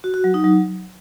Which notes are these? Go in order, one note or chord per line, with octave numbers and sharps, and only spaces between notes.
F#4
F#4
F#3
D#4
F#3